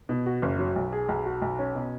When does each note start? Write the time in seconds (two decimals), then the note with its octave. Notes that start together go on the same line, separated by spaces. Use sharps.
0.09 B2
0.26 F#4
0.42 F#1
0.59 F#3
0.76 B1
0.92 G#4
1.09 B1
1.26 F#4
1.42 B1
1.59 C#4
1.75 B2